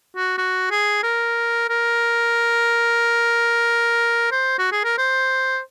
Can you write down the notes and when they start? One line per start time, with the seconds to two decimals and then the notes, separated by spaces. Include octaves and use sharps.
0.16 F#4
0.38 F#4
0.71 G#4
1.03 A#4
1.69 A#4
4.31 C5
4.58 F#4
4.72 G#4
4.84 A#4
4.98 C5